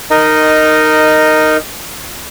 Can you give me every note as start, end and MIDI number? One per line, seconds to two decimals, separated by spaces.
0.11 1.57 63
0.11 1.57 70
0.11 1.57 75